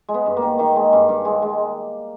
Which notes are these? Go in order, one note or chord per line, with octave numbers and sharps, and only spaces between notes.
G#3
B3
G2
A#3
D#3
D#3 A#3
G#3
G2
G2
G#3
G#3